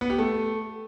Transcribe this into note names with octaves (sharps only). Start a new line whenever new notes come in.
B3
G4
A3